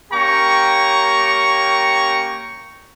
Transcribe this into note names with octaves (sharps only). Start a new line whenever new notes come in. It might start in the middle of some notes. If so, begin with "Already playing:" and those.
A#3 C#4 G4 G5 A#5 C#6